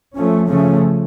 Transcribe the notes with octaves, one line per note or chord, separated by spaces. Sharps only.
F3 A3 C#4
C#3 F3 A3 C#4